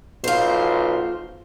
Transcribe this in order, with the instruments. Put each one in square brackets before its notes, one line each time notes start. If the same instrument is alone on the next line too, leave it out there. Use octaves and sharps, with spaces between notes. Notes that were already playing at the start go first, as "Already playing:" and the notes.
[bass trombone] B1 [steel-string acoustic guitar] F4 C5